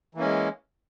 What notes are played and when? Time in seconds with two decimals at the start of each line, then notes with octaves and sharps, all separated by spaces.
0.15 E3
0.17 A#3
0.20 C#4
0.23 G#3